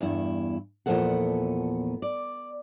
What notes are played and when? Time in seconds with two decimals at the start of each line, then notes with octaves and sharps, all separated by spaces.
0.01 E2 G2 E4
0.86 E2 A#2 F3 B3 A4 F#5
2.02 D5